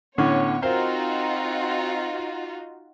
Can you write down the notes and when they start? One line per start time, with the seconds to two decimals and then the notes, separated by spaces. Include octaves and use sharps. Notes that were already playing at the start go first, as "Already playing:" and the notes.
0.18 A2 D3 B3 C#4 C#5
0.62 C4 D#4 F4 F#4 A#4 C5 F5